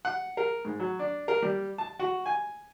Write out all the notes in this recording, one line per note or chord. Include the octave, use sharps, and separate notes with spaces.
F#5
A#4
G#2
F#3
D4
A#4
G3
A5
F#4
G#5